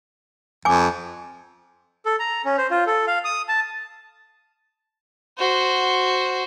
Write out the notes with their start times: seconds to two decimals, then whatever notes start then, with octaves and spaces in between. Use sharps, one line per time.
0.65 F2 G#5 D6
2.06 A4
2.20 A#5
2.45 C#4
2.58 C5
2.71 F4
2.87 A4
3.07 F5
3.24 D#6
3.48 A5
5.38 F#4 C5